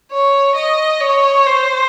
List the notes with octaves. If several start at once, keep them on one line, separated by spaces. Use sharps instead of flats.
C#5
D#5
C#5
C5